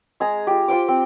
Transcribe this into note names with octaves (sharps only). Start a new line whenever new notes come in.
G#3 G#4 F5 A#5
F4 G4
F4 C5 G5 D6
C4